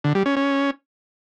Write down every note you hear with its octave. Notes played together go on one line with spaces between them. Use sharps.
D3
G3
C#4
C#4